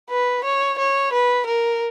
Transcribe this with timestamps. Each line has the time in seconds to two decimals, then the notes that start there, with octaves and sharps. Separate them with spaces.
0.10 B4
0.44 C#5
0.78 C#5
1.13 B4
1.46 A#4